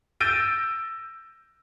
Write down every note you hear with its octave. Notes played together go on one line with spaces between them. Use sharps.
E6 G6 A6 A#6 D7 D#7